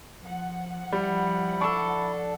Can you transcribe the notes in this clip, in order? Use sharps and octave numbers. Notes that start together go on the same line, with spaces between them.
F3 F#5
G3 E4
D4 A4 C#6